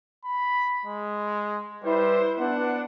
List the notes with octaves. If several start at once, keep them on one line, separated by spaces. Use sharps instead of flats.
B5
G#3
G3 E4 B4 C5
B3 D4 F#5